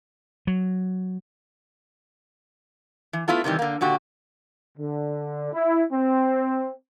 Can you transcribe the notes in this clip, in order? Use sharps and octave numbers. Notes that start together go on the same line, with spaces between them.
F#3
E3
A3 B3 E4 F4 A4
C3 D#3 E3 G3
D3 A#3
A#2 D3 F#4 G4
D3
E4
C4